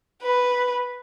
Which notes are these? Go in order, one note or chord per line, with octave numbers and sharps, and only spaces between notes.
B4